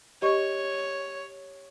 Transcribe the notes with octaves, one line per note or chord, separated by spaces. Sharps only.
G4 C#5 D#5 C#6